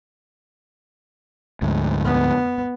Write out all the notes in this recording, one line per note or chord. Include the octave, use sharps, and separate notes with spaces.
D2 G#2
B3